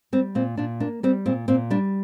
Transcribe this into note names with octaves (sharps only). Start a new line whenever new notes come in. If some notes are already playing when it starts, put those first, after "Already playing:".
G3 C4
A#2 C4
A#2 D4
A#3 D4
G3 C4
A#2 C4
A#2 C4
G3 D4